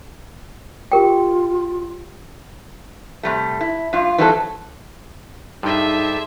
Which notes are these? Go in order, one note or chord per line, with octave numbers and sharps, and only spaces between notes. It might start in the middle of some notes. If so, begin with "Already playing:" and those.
F4 G4 A#4 G5
C3 G3 A3
E4
G2 F4
E3 F#3 G3 C4 F4 A4
G2 D#4 G#4 A4 C5 D5 E5